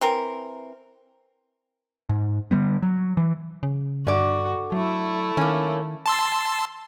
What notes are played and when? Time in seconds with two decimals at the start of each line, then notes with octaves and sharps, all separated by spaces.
0.01 E3 C4 A#4
2.09 G#2
2.51 D3 F#3 G3 B3
2.82 F#3
3.17 E3
3.63 C#3
4.07 G2 D3 F#4 D5
4.72 F#3 A3 E4
5.37 D#3 A#3 C#4
6.06 A5 C6 E6